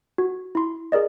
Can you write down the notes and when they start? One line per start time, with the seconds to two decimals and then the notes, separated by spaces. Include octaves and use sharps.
0.18 F#4
0.55 E4 C6
0.92 G#4 A#4 D5 D#5